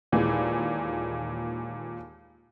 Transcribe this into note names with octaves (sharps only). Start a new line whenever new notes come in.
D#2 A#2 E3 G#3